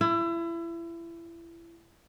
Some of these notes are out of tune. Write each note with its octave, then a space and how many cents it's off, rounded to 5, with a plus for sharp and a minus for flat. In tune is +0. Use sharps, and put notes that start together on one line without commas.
E4 +30